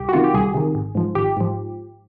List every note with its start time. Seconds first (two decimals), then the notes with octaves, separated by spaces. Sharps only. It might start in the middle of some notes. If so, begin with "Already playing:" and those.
Already playing: C2 G4
0.09 F#4
0.13 C3 D#3 F4
0.24 G4
0.34 C2 G#4
0.54 C3 D#3
0.75 G#1
0.95 G#2 F3
1.15 G#1 G4
1.37 G#2 F3